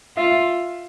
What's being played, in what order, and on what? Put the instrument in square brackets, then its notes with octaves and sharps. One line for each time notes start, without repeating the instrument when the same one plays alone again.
[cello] F4 [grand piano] E5